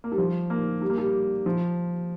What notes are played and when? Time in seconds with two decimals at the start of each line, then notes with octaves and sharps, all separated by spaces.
0.04 A#3
0.12 G3
0.18 F3
0.50 A#3
0.81 G3
0.90 A#3
0.98 G3
1.46 F3